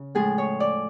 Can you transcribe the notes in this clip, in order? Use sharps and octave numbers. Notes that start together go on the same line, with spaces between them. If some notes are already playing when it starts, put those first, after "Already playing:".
Already playing: C#3
A2 F3 G#3 G#4
C#5
D5